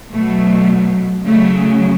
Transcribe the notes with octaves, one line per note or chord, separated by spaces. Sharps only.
B2 F#3 A3
C#3 F#3 A3